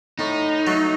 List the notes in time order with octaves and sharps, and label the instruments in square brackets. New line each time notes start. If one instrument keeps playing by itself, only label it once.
[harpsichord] A2 [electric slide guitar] D#4
[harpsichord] F#3 A3